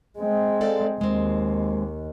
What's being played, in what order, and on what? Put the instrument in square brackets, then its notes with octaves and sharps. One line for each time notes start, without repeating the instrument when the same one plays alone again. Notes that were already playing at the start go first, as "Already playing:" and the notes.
[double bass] G#3 C4
[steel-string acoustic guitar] A4 D5 F5
[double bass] D#2 [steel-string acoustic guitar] G#3 C4